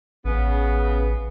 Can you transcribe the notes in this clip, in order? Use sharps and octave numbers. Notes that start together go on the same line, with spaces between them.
A1 C#3 B3